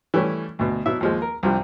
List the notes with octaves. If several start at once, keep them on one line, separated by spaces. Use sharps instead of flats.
E3 G3 A3 C#4
D2 B2
B2 F#3 E4 E5
D#2 F3 G#3
A#4
C2 G2 F3